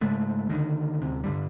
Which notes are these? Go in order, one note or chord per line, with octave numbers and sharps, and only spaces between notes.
G#2 C#3 G#3 A3
C#2 D3 D#3
D2 C3
G2 D3 G3